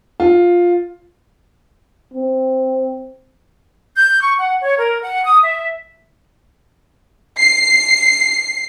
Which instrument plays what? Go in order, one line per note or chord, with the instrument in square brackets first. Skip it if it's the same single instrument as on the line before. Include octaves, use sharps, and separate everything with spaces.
[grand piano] F4
[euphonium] C4
[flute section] G6
C#6
F#5
C#5
A#4
F#5
D#6
E5
[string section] C7